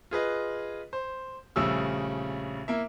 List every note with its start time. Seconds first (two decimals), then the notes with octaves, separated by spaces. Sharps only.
0.11 F4 G#4 B4 D#5
0.93 C5
1.56 A#1 C#3 G3 A3 E6
2.68 A#3 E4 E5